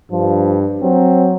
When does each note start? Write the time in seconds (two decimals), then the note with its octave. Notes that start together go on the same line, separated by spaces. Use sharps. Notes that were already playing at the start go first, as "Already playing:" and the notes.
0.11 G2 F3
0.81 F#3 C4